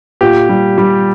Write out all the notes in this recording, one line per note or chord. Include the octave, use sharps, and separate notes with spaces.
A#2 G4
G3
G3